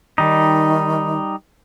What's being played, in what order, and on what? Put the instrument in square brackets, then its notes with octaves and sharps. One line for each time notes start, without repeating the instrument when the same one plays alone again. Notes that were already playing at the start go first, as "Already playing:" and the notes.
[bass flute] D#3 [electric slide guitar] G3 D#4